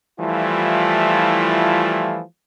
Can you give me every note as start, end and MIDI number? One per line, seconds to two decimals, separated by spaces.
0.20 2.21 52
0.20 2.21 53
0.20 2.21 55
0.20 2.21 57
0.20 2.21 64
0.20 2.21 65